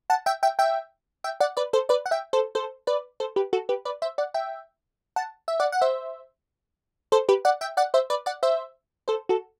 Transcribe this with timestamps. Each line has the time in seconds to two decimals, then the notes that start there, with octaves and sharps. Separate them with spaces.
0.10 F#5 A5
0.26 E5 G5
0.43 E5 G5
0.59 E5 G5
1.24 E5 G5
1.40 D5 F#5
1.57 B4 D5
1.73 A4 C5
1.89 B4 D5
2.06 F#5
2.11 E5 G5
2.33 A4 C5
2.55 A4 C5
2.87 B4 D5
3.20 A4 C5
3.36 G4 B4
3.53 F#4 A4
3.69 G4 B4
3.85 B4 D5
4.02 C5 E5
4.18 D5 F#5
4.34 E5 G5
5.16 F#5 A5
5.48 E5
5.60 D5 F#5
5.72 F#5
5.81 C5 E5
7.12 A4 C5
7.29 G4 B4
7.45 D5 F#5
7.61 E5 G5
7.77 D5 F#5
7.94 C5 E5
8.10 B4 D5
8.26 D5 F#5
8.43 C5 E5
9.08 A4 C5
9.29 F#4 A4